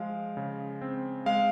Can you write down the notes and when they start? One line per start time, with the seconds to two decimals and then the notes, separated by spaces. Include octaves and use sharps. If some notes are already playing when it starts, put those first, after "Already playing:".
Already playing: F3 G#3 F5
0.37 C#3
0.82 C4
1.26 G#3 F5